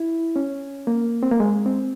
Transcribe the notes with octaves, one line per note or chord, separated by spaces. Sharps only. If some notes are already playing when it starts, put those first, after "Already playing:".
Already playing: E4
C#4
A#3
C4
A#3
G#3
C4